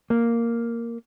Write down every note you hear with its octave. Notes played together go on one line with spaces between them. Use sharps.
A#3